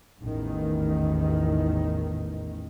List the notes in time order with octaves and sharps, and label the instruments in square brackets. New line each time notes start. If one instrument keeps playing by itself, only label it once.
[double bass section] A1 E2 D#3